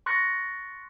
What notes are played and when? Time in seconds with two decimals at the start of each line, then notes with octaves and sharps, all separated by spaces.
0.06 C6 C#6 F#6 A6 A#6 C#7